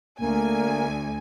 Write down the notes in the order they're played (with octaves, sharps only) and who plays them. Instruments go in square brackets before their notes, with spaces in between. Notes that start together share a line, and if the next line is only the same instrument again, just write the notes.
[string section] D2 G#5 [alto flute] A#3